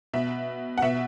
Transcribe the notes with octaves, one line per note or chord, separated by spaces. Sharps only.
B2 E5
F#5
B2 E5